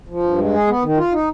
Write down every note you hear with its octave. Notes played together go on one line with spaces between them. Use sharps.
F3
G2
G#3
G#4
B3
D#3
F4
D#4